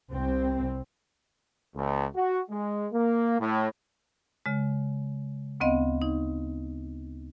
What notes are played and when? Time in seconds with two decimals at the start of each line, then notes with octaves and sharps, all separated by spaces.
0.12 C2 C4
1.76 C#2
2.15 F#4
2.50 G#3
2.93 A#3
3.40 A2
4.46 C#3 G#3
5.60 D2 B3 C4 D#5 F5
6.02 D#4